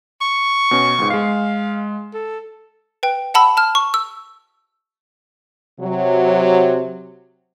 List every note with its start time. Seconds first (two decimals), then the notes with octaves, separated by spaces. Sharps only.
0.21 C#6
0.71 B2 C#4
0.98 C#2 G#2
1.10 G#3 F5 C7
2.14 A4
3.03 B4 G5
3.34 F#5 A5 B5 E6
3.57 A5 F6
3.75 C#6
3.94 E6
5.80 C3 F#3